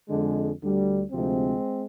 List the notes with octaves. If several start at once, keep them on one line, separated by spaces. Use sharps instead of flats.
F2 D3 G#3
D2 D3 G3
D2 C3 F3 G#3 C4